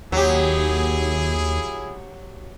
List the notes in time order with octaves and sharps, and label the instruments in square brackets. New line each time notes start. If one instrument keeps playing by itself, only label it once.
[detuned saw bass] D#2 [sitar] F#3 G4 [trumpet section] E4 G#4